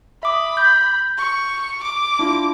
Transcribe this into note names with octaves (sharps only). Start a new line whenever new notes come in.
E5 B5 D6 D#6
G6
C#6
D6
D4 E4 F4